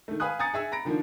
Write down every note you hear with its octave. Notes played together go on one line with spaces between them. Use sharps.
D#3 A3
B4 F5 G#5 B5 D#6 F#6
G#5 A#5 D#6 A6 C#7
G#4 E5 G#5 E6
A#5 B5 A#6 D7
D3 D#3 F3 A#3